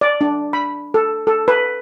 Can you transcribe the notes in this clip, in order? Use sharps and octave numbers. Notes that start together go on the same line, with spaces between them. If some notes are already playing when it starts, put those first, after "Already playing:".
D5
D4
B5
A4
A4
B4